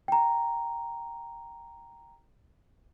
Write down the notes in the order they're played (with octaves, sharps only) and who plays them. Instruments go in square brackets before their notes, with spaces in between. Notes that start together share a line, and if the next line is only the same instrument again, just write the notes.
[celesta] G5 A#5